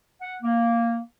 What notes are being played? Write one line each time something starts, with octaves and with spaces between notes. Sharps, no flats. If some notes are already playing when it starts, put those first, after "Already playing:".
F#5
A#3